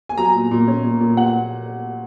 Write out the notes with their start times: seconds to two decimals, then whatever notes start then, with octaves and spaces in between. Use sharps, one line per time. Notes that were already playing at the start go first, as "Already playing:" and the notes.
0.09 G#5
0.18 F#3 A#5
0.35 A#2
0.51 A#2
0.68 C#4
0.84 A#2
1.00 A#2
1.17 A#2 F#5